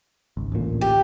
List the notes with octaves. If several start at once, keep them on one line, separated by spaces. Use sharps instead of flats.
G#1 C#2
A1 D2 A#2
G4